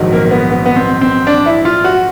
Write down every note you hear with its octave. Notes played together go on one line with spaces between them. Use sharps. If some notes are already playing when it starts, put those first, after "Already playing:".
Already playing: A#1 G#2 D#3 F#3
A#3
A#3
B3
B3
B3
C4
C4
D4
E4
F4
F#4